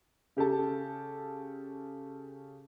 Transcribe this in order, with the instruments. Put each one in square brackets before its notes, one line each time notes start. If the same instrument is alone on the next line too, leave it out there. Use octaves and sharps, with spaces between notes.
[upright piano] C#3 G4 A4 A5